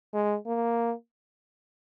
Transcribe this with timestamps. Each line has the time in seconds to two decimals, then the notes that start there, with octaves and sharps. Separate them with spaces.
0.14 G#3
0.47 A#3